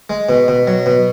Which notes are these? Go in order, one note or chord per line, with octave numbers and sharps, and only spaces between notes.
G#3
B2
B2
F#3
B2